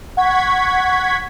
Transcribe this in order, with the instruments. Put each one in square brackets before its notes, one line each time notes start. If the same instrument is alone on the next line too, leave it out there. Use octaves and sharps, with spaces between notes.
[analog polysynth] F#5 C#6 G#6 B6